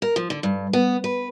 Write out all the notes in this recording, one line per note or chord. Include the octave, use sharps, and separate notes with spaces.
A#4
F3
D3
G2
B3
B4